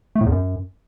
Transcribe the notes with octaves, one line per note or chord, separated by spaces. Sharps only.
A3
A2
E2
F#2